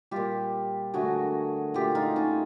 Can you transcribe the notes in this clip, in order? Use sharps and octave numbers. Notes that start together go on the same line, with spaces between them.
A#2 G3 F4 G4
D3 F#3 A3 F#4 G#4
A#2 F#3 A3 F4 G4
D#4 F4
C#4 D#4